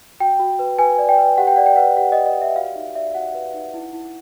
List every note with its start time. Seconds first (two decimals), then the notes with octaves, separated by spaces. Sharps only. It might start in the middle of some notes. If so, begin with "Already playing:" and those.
0.20 F#4 G5
0.39 F#4
0.59 B4
0.78 B4 G#5
0.98 D5
1.09 G5
1.18 B4
1.38 G4 F#5
1.47 G5
1.56 D5 F#5
1.66 G5
1.76 B4 F#5
1.97 G4 F#5
2.12 D5 D#5
2.26 D#5
2.37 G4 E5
2.56 F#4 F5
2.75 D#4 E5
2.95 D5 E5
3.15 F#4 F#5
3.34 B4
3.54 D#4
3.74 E4
3.93 E4